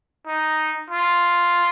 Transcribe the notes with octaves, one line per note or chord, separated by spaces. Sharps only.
D#4
F4